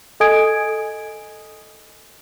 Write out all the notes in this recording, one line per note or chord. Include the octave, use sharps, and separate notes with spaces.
A4 D#5 G#5 D#6 G#6 D7